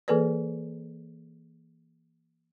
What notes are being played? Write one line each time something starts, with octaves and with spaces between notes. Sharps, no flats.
E3 A#3 G#4 A4 B4 D5